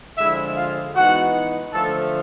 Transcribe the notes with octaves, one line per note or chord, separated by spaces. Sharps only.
D3 F3 G#3 E4 E5
F4 F5
E3 G#3 B3 D#4 F#4 F#5
D3 F3 A3 A4 A5